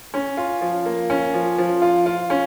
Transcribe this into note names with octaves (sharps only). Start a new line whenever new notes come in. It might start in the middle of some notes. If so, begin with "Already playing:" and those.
C#4
F4
F3
A#3
C#4
F3
F3
F4
F4
C#4